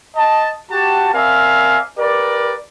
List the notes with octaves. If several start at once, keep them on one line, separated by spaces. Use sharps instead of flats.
D#5 A5
F#4 G4 A5
C4 A#4 D5 E5 F5 G#5
G4 A#4 B4 D5